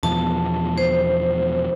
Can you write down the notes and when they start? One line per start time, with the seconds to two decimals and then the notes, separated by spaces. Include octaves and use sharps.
0.03 E2 B2 F3 A5
0.78 C5